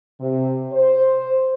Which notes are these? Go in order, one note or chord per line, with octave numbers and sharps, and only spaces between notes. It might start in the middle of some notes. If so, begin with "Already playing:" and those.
C3
C5